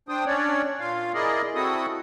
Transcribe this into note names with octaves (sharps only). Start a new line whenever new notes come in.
D4 C5 G5 D#6
C#4 D4 C#5 D5
A#2 F4 F5
E4 G#4 A#4 D5 D#5
C4 E4 F#4 A4 D#6